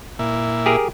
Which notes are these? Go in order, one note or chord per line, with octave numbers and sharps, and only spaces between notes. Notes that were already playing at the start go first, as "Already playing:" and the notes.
A#2 E4
G4 G#4 A#4